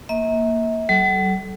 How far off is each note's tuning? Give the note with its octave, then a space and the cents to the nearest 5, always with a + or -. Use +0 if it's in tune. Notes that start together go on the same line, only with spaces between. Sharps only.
A#3 +0 E5 -40
F#3 +45 A4 -20